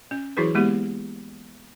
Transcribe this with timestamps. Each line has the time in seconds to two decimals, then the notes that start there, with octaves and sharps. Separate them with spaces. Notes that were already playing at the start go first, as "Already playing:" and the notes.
0.11 C#4
0.37 E3 F#3 E4 F#4 G#4 B4
0.55 G#3 A#3 B3 E4 G4